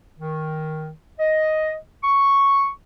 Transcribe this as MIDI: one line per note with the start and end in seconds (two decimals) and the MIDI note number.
0.18 0.91 51
1.19 1.74 75
2.04 2.68 85